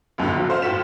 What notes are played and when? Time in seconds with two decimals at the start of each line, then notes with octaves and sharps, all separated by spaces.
0.18 C#2 F#2 A2 D3
0.32 F#1 F3 F#3
0.47 F#4 A4 C5 F5
0.62 A2 F4 F#4 B6 E7